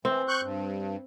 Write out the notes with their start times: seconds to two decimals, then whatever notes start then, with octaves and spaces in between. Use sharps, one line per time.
0.05 E3 C4
0.28 C#6 F#6 G6
0.41 G2